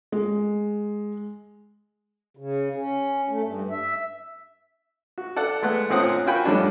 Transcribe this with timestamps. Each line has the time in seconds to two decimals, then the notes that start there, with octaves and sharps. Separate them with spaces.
0.12 G#3
2.37 C#3
2.76 C#4
3.29 A3
3.43 G2
3.71 E5
5.18 F#4
5.36 A4 D5 F#5
5.62 G#3 A3 B3 F#5
5.90 D2 A#2 C4 C#4 F#5 D#6
6.26 F4 F#4 A#4 G5 G#5 B5
6.45 F2 G#2 G3 A3 C#4 D4